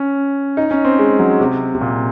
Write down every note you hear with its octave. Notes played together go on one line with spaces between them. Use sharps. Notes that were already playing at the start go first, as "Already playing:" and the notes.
Already playing: C#4
D#4
C#4
C4
G#3
F#3
C3
C3
A#2